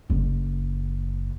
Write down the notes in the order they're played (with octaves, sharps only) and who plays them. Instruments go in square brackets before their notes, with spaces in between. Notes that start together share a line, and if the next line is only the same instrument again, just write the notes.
[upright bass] F#1